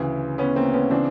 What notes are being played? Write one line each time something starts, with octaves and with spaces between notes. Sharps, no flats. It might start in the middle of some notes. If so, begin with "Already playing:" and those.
Already playing: D2 C#3 E3
B3 C#4
A#3 C4
B3 C#4
C#3 E3 C4 D4